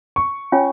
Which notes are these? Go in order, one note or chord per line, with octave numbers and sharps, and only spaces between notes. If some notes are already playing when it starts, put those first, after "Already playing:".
C#6
C#4 F4 C#5 G#5